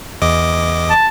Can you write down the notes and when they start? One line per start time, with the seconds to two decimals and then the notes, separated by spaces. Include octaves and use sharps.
0.22 E2 D#5 D6
0.90 A5